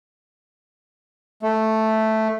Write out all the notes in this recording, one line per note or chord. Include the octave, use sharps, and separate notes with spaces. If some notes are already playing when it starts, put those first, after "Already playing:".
A3